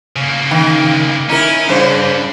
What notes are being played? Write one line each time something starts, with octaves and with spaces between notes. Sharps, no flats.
C#3 A#3
D#3
C#4 D#4 E4 A#4
G2 C#3 C5